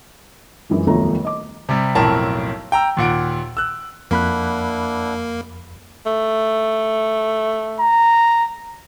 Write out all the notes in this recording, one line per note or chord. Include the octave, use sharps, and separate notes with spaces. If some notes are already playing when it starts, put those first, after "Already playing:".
F#2 E3 F3 G#3
D#1 B1 F2 A3 A#5
D#5 D6
C3 G3
B1 F2 A2 A#4 A5
G5 A#5 E6
D#2 A#2 F#5 D7
E6 F#6
F2 A#3 D4 E4 F#5 B5 F#6
A3
A#5